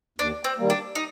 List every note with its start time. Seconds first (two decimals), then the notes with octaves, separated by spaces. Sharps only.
0.19 D#2 D4
0.44 C4
0.58 D#3 G3 A#3
0.70 D4
0.95 D#4